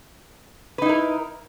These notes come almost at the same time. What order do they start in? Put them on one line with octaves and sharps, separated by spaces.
B4 D#4 E4 A#4